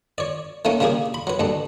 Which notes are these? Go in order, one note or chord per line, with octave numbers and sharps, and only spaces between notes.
C#5 D5
D#3 A3 A#3 C#4
C#3 G3 A#3 G4 G#4
B5
F#3 B4
D2 G2 D4